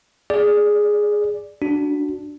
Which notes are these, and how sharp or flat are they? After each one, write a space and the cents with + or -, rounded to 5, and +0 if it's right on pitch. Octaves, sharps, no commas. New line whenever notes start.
G#4 +0 D5 +0
D4 +0 F#4 +0